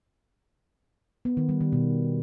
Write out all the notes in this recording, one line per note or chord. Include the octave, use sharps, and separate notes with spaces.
B3
D#3
G3
D#3
B2